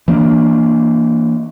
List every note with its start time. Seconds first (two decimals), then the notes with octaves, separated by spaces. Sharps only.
0.08 E3 A#3 D4